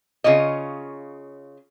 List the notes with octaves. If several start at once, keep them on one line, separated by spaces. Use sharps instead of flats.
C#3 F4 C#5 D#5